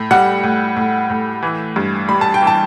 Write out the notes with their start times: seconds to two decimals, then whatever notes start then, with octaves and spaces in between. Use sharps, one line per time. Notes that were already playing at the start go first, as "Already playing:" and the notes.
Already playing: A2
0.11 G3 F#5
0.43 A2
0.77 A2
1.10 A2
1.43 E3
1.76 G2
2.09 G3 B5
2.21 A5
2.34 G5
2.41 E3
2.47 A5